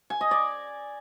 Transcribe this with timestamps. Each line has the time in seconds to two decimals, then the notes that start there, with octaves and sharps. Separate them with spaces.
0.10 G#5
0.21 D#5
0.31 D5